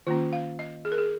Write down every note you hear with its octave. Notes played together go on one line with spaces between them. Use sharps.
D#3 A#3 C#4 F4
F5
D#5
G#4
A#4
G#4